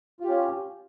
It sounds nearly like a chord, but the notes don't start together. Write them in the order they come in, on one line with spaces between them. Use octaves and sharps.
F4 G4 C#4